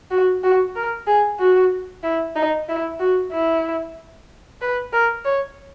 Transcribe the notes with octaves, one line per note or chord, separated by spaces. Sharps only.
F#4
F#4
A#4
G#4
F#4
E4
D#4
E4
F#4
E4
B4
A#4
C#5